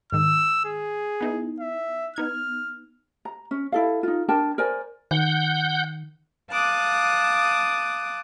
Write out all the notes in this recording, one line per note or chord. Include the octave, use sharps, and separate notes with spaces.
G#2 D#3 E6
G#4
B3 D#4 E4
E5
B3 D#4 F6 G#6
A#5
C#4
E4 A4 F5
D#4 F4
D4 A#4 G5 A5
A#4 C5 D5 G#5
D#3 F#5 G6
F5 A5 D6 D#6 F#6